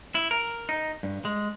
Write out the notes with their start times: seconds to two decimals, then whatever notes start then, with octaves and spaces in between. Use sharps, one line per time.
0.15 E4
0.31 A#4
0.69 D#4
1.03 G2
1.25 G#3